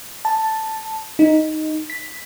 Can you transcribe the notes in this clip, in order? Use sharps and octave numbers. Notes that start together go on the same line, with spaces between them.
A5
D#4
B6